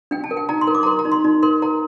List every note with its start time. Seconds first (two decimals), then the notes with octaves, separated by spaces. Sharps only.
0.11 D4 G5
0.24 A5
0.31 A#4
0.37 G5
0.49 D#4 A#5
0.61 C6
0.67 A#4
0.75 D6
0.83 A#5
0.86 A#4 C6
0.99 A#5
1.05 D#4
1.12 C6
1.24 D#4
1.43 A#4 C6
1.62 A#4 A#5